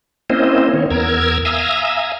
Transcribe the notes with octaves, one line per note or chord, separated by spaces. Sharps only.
A#3 C4 C#4 E4 C5 D#5
D#3 B3 C#5
E2 B3 A#4 A#5 E6 G#6
E5 F5 G#5 A#5 D#6 E6